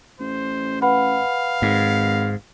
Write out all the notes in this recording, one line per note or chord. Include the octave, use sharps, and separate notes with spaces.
A1 C5
B4 F5 F#5 B5
G#1 G#2